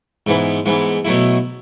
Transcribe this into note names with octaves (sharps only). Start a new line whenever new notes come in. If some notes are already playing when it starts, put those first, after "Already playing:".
G#2 E3 B3
G#2 E3 B3
B2 F#3 A3 E4